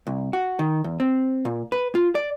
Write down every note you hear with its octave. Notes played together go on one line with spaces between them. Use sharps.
C2
F#4
D#3
E2
C4
A#2
B4
F4
D5